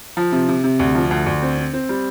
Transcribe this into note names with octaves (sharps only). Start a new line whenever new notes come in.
F3
C3
C3
C3
D2
F3
D2
D2
C4
C4
C4
G3